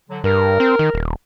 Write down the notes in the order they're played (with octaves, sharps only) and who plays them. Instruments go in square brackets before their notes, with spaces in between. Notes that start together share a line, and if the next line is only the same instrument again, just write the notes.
[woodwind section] D3 F#3
[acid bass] G2 [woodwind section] A#4
[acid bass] C4
D#3
D#1